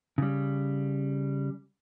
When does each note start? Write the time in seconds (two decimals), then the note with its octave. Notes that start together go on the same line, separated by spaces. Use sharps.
0.18 C#3 G3